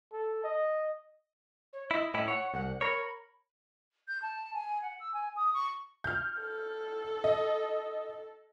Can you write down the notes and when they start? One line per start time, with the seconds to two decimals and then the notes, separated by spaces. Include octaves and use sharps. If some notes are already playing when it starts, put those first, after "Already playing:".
0.13 A4
0.44 D#5
1.73 C#5
1.91 E4 D#5
2.14 A2 C#4 E4
2.28 C#5 F#5
2.54 C2 F#5
2.81 A#4 C#5 B5
4.08 G6
4.22 A5
4.54 G#5
4.82 F#5
4.99 E6
5.13 G#5
5.36 D#6
5.53 C#6
6.04 F6 G6
6.41 A4
7.24 D#5